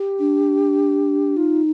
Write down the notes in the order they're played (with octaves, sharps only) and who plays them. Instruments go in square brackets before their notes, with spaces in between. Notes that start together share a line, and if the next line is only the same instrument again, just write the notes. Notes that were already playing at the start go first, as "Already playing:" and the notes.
Already playing: [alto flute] G4
[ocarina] D4
[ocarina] D#4 [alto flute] F4